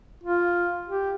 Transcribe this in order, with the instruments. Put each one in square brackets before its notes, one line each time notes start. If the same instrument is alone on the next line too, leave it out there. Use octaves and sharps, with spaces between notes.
[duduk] F4
G4